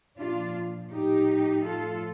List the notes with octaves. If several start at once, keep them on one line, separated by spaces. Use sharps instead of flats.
A#2 F3 D4 F4
A2 F3 D#4 G4
A2 F3 F4 A4